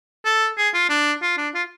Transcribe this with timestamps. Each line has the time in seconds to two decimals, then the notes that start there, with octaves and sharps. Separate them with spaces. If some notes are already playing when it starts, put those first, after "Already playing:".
0.25 A4
0.57 G#4
0.74 F4
0.90 D4
1.22 F4
1.37 D4
1.54 F4